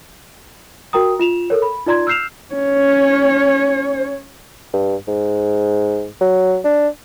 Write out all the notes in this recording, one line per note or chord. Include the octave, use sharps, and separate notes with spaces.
F#4 A#4 G5 A#5 D#6
F4 E7 F7
A4 A#4 C#5
B5
D#4 F4 D5 A#5 C6 G#6
E6 F6 G6 C7 E7 F7
C#4 C#5
G2
G#2
F#3
D4